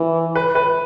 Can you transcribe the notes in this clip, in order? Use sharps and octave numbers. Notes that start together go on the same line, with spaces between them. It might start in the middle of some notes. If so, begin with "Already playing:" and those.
Already playing: E3
B4
B4